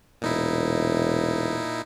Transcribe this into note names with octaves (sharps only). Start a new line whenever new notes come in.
E1 A#2 D#4 E4